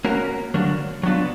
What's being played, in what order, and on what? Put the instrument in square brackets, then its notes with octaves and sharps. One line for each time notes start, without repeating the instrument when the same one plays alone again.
[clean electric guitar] A#3 C#4 F#4 A#4
D3 F#3 A#3 D4 F#4
F#3 B3 D4 F4